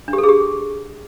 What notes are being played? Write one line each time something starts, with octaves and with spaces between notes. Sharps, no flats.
D4
G4
A4
G#4
G4